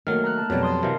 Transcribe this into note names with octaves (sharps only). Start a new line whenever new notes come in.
D#3 F#3 A3 A#3 F6
A#5 F6 F#6
A5
F2 B2 F#3 G3
A5 C6 D#6
C3 E3 A#4 D#5 F5